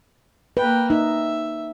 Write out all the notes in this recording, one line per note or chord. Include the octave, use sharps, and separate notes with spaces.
A#3 B4 G5
D#4 E5